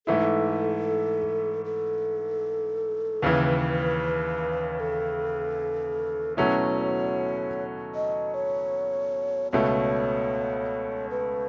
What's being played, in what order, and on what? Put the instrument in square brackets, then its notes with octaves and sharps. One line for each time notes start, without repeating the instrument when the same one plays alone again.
[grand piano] G#2 E3 A3 E4 [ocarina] A4
[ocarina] A4
[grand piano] D#2 C#3 E3 [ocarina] B4
[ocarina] A4
[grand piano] B2 F#3 A3 C#4 E4 [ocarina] C#5
[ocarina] D#5
C#5
[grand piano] C#2 B2 A3 [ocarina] C#5
[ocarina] B4